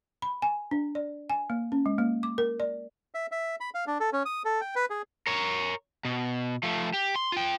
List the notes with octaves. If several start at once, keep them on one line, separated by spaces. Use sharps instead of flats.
B5
G#5
D4
D5
G#5
A#3
C#4
G#3
A#3
D6
A#4
D5
E5
E5
B5
F5
D4
A4
C#4
D#6
A4
G5
B4
G#4
A#4 C#5
B2
F3 A3
G4
C6
F4 G5